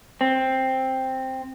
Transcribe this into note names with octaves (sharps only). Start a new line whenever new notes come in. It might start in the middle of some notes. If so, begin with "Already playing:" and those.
C4